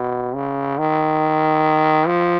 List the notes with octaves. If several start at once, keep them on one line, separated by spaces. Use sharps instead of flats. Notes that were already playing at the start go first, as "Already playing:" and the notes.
Already playing: B2
C#3
D#3
F3